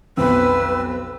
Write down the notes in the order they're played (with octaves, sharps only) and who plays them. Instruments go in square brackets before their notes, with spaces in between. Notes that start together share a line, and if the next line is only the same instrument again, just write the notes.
[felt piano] B1 F2 [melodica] C4 E6 [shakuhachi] B4